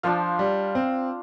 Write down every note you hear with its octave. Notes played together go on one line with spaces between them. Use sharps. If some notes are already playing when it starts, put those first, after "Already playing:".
F3 D4 F4 C5 F5
G3
C4